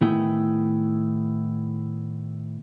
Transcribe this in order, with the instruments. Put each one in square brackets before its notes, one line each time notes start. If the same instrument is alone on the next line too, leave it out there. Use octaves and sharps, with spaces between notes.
[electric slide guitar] A2 D#3 B3 E4 G#4 G5